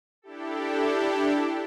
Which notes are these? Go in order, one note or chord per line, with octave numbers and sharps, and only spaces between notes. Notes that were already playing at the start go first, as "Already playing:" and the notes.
D4 E4 G4 A4